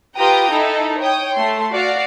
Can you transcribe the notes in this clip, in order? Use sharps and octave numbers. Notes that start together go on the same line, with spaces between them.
F4 G4 B4 G5 A#5 D#6
D#4 E4 A4
C#5 G5 D#6
A3 C6
F#4 D5 F5